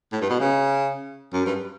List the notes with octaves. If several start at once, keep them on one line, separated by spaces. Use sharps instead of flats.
A2
G2
B2
C#3
F#2
G2